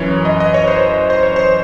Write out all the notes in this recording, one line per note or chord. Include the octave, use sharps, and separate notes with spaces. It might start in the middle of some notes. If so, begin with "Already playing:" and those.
Already playing: F#2 E3 C#5
D#5
D#5
C#5
C5
C5
C#5
C5